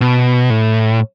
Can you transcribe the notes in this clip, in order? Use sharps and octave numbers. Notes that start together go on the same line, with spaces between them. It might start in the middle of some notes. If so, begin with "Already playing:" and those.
B2
A2